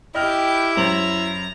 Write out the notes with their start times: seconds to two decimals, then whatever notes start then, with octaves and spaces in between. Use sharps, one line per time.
0.15 E4 G4 D#5 G5 F6
0.77 F#2 C5 A#5 F#7